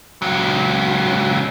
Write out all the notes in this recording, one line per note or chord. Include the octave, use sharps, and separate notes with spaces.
C#2 F#3